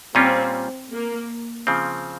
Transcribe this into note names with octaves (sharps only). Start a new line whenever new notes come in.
A#2 G3 C4 C#4 F4
A#3
C#3 F3 C4